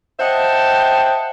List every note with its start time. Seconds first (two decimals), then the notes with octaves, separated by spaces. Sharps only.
0.20 C5 D#5 E5 F#5 G5 A5